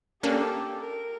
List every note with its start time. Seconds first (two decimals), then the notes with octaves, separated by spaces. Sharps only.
0.23 A#3 C#4 D4 G4 A4
0.80 A#4